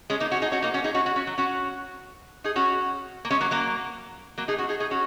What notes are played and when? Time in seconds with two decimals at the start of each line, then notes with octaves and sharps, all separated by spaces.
0.10 G#3 C#4
0.20 A#3 D#4
0.32 C#4 F#4
0.42 D#4 G#4
0.52 C#4 F#4
0.62 A#3 D#4
0.74 C#4 F#4
0.84 D#4 G#4
0.94 C#4 F#4
1.05 C#4 F#4
1.16 C#4 F#4
1.27 F#3
1.38 C#4 F#4
2.44 D#4 G#4
2.56 C#4 F#4
3.25 A#3
3.31 G#3 C#4
3.40 F#3 A#3
3.51 F#3 A#3
4.38 F#3 A#3
4.48 D#4 G#4
4.58 C#4 F#4
4.69 D#4 G#4
4.80 D#4 G#4
4.91 C#4 F#4